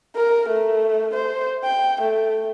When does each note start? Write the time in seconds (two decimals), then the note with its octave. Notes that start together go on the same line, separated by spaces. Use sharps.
0.16 A#4
0.49 A3
1.14 C5
1.64 G5
2.01 A3